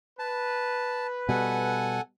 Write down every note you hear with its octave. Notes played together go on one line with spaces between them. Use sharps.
B4 A5
B2 G3 A4 F#5 G#5